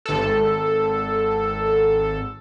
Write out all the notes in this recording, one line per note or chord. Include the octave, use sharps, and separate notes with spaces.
G#1 A4